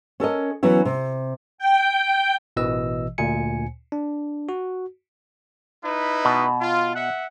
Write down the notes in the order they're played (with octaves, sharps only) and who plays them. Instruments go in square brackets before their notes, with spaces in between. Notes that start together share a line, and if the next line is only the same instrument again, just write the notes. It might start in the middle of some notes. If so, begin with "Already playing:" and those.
[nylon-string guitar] C#4 A4 A#4 D#5
E3 F#3 B3 C#4 E4
C3
[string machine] G5
[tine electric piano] A1 B2 E3 D#5 E6
D2 A#2 G#5 C#7
D4
F#4
[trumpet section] D#4 E4 B4
[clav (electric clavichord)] B2
[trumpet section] F4
E5 F#5